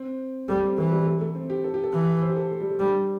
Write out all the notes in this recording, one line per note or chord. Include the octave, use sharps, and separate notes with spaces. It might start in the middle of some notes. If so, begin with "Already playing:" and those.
Already playing: C4
G3 A3
C4
E3 A3
G3
A3
A3
C4
G4
A4
G4
A4
E3
C5
G4
A4
A3
G3
A3
G3 D4